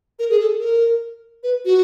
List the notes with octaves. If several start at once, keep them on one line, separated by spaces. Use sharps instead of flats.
A#4
G#4
A4
A#4
B4
F#4